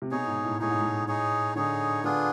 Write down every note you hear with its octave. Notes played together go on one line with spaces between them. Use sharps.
C3
B2 D#4 G#4 C#5
G#2
A2
A2 D#4 G#4 C#5
G#2
A2
D#4 G#4 C#5
D3 D#4 G#4 C#5
D3 B3 D4 F4 G#4